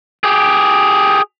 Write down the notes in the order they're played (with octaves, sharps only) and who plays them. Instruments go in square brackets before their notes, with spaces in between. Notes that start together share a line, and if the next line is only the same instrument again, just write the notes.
[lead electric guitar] G4 G#4